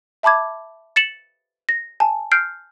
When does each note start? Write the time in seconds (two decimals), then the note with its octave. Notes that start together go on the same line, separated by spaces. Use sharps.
0.23 E5 A5 B5 D6 G#6
0.96 A6 C#7 E7 F#7
1.69 A#6
2.00 G#5 A5
2.32 F6 G6 C7 D7